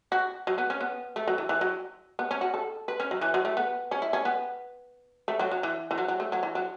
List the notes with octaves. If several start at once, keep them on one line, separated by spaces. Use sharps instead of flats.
F#4
F#3
B3
C#4
B3
A3
F#3
E3
E3
F#3
B3
C#4
F#4
A4
B4
C#4
F#3
E3
F#3
A3
B3
C#4
E4
C#4
B3
A3
F#3
F#3
E3
E3
F#3
F#3
A3
F#3
E3
F#3